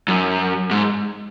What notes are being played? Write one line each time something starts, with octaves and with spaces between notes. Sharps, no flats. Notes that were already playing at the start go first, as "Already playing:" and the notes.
F#2
G#2